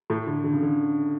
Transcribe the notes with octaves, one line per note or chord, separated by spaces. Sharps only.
A2
D3
D3
C#3
D3